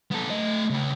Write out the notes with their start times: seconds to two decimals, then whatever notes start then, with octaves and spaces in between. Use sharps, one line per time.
0.11 B3 A4
0.30 A3 D#5
0.70 C#3 B4